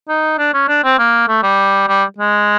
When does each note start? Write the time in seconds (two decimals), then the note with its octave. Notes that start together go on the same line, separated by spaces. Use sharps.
0.09 D#4
0.38 D4
0.54 C#4
0.68 D4
0.84 C4
0.99 A#3
1.28 A3
1.43 G3
1.88 G3
2.18 G#3